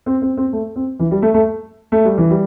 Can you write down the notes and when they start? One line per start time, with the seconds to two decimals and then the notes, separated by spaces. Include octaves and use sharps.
0.06 C4
0.22 C4
0.37 C4
0.53 A3
0.76 C4
0.99 E3
1.11 G3
1.22 A3
1.34 A3
1.92 A3
2.05 G3
2.17 E3
2.30 G3